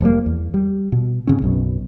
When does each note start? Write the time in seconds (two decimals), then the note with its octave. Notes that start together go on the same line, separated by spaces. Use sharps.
0.01 F1 F3 G3 A#3
0.26 E2
0.54 G3
0.92 B2
1.27 G#2 C#3 C4 C#4
1.42 B1 F#2 B2